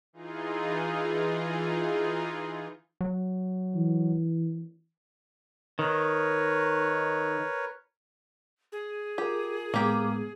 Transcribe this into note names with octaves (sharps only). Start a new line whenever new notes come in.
E3 D#4 F4 G#4
F#3
E3
D#3 A#4 B4 C#5
G#4
F4 G4 A#4
A2 G#3 A#3 B3 G4